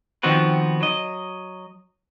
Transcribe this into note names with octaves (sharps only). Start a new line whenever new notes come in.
D#3 F3 B3 C4 F#4 B4
F#3 D#5